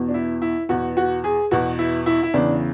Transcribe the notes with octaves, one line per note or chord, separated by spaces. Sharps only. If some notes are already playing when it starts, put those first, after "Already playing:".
Already playing: E2 B2
D4
E4
E4
E2 B2 F#4
F#4
G#4
E2 B2 F#4
E4
E4
E4
E2 C#3 E3 D4